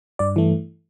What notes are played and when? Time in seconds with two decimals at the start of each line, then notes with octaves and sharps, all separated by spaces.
0.19 G2 D5
0.36 E3 A3